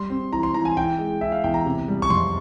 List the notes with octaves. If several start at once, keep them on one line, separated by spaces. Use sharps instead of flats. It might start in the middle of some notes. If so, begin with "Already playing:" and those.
Already playing: G3 C6
C4
E3 A#5
C6
E3 A#5
G#5
E3 G5
G#3
E4 E5
F5
E2 G5
A#5
C3
G3
C#6
F2 C6